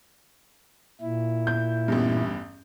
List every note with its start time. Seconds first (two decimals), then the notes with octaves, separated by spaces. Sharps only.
1.01 A#2 E4
1.47 G6
1.88 A1 E2 G2